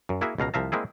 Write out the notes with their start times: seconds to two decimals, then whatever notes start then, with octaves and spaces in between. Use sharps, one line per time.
0.09 F#2
0.21 A#3 E4 F#4 G#4 E5
0.38 C#2 B2 F5 A#5
0.54 C2 F3 E5 F5 A#5
0.72 G#3 A#3 C4 E4 G#4